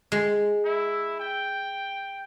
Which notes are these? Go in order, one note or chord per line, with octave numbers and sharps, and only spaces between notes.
G#3
E4
G5